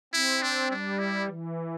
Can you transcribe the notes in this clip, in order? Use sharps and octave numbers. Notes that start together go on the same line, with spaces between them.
C4 E4
D4
G3 D4
E4
E3